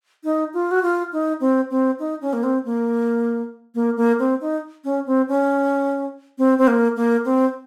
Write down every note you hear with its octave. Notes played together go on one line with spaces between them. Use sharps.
D#4
F4
F#4
F4
D#4
C4
C4
D#4
C#4
A#3
C4
A#3
A#3
A#3
C4
D#4
C#4
C4
C#4
C4
C4
A#3
A#3
C4